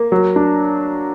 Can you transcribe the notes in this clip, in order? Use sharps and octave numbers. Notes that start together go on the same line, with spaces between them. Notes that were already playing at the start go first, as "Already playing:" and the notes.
Already playing: A#3
F#3
D4